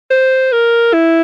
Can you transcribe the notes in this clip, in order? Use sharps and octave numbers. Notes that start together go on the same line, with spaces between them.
C5
A#4
E4